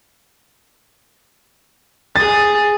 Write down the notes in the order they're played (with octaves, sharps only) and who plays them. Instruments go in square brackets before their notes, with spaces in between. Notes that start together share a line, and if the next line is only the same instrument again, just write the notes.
[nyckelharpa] G#4 D#6 [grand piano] A6